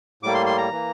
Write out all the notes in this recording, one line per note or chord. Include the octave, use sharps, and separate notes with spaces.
A2 G3 A#3 D6
C6
C6
A#5
E3 A#3